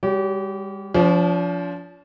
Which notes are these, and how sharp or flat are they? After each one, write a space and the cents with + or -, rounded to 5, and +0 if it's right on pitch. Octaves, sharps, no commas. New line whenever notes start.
G3 +40 G4 -35 C#5 +35
F3 +0 D4 -45